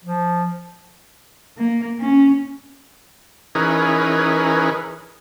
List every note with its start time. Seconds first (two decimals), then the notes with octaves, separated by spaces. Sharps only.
0.04 F3
1.58 A#3
2.00 C#4
3.55 E3 C#4 D#4 G#4 A#4 B4